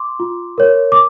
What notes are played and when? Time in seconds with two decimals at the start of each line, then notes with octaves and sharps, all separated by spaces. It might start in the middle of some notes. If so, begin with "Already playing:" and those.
Already playing: C6 D6
0.20 F4
0.58 A#4 C#5
0.92 D6